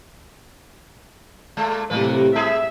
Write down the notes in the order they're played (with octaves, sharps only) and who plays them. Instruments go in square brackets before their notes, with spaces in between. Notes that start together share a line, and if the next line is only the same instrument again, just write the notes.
[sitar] A#2 G#3 A3
[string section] A2 C3 [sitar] F#3 A#3 B4
[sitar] G3 E4 G#4 [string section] E5